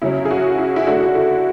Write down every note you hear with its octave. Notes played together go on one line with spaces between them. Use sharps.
C#3 F#3 C#4 E4
G#4
F#4
E4
E4
D3 A3 D4 F#4
E4